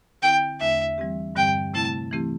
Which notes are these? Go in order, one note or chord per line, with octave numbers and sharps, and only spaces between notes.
D3 C4 E4 G5
E2 D3 A3 D4 E5
E3 G3 C4 G4
G2 D3 G3 C4 G4 G5
C3 A3 C4 E4 A5
E3 A3 C4 E4 G4